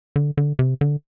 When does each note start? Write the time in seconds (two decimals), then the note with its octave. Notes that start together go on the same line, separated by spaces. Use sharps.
0.16 D3
0.37 D3
0.59 C3
0.81 D3